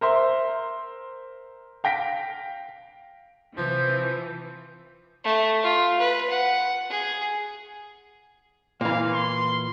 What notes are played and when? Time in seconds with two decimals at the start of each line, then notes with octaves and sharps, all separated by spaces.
0.01 A#4 C5 E5 C6
1.84 F5 G5 A#6 B6 D7
3.58 C3 E3 F3 G6
5.24 A3
5.63 F4
5.99 B4
6.29 F#5
6.90 G#4
8.81 A#2 E3 F5
9.14 C6